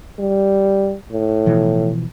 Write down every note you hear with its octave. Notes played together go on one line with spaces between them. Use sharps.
G3
A2
B2 E3 F3